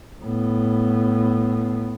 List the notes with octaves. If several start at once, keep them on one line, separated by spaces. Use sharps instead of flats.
A2 B3